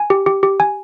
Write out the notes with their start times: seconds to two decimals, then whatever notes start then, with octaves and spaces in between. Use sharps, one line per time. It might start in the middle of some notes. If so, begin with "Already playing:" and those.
Already playing: G#5
0.10 G4
0.26 G4
0.43 G4
0.60 G#5